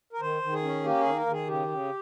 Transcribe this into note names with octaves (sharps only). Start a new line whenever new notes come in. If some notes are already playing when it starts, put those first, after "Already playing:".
A#4
D#3 C5
D#3
G#4
C#4
A#3 G4
D#3 G#4
A#4
D#3
G#4
C#3 G4
C#3